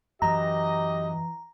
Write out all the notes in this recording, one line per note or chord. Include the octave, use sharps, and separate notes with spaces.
F#2 E3 G4 D#5 A#5